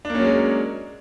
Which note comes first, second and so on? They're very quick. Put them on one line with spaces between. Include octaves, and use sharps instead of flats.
D4 A#3 C#4 F#3 G#3